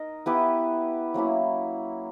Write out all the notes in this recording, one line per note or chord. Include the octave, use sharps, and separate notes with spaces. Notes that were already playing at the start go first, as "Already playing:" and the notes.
Already playing: D#4 A#4 D#5
B3 E4 G4 B4
F#3 A#3 C#4 E4